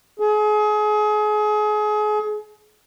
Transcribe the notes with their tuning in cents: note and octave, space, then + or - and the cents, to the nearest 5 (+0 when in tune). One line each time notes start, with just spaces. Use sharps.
G#4 +30